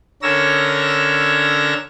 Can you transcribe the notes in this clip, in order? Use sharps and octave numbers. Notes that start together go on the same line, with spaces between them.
D3 C#4 A#4 C#5 E6 A#6